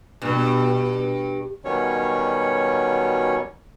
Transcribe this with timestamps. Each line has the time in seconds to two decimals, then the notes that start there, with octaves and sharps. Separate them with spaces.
0.22 G2 B2
1.65 B2 D#3 F#3 G3 C#4 C#5